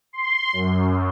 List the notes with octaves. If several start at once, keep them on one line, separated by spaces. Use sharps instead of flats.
C6
F#2